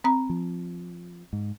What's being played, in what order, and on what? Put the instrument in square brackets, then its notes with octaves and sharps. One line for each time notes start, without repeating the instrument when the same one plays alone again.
[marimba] C4 A#5
[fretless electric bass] F3
G#2